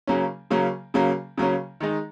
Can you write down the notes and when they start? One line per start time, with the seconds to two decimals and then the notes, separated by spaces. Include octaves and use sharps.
0.07 C#3 F#3 A#3 C#4
0.51 C#3 F#3 A#3 C#4
0.94 C#3 F#3 A#3 C#4
1.38 C#3 F#3 A#3 C#4
1.80 D#3 G#3 D#4